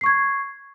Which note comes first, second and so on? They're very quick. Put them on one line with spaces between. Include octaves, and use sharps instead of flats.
C7 C#6 G#6